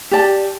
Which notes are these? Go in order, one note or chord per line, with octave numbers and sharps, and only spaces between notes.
G4 D5 A5